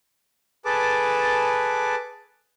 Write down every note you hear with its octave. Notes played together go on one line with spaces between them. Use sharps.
G#4 A4 B4 A5 D6